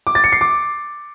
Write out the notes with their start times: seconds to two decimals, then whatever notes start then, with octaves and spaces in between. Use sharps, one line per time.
0.07 D6
0.15 A6
0.24 C#7
0.32 C7
0.41 D6